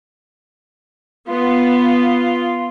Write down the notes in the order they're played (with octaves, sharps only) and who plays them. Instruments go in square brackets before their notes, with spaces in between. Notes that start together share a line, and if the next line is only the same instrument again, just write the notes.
[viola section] B3 [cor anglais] F4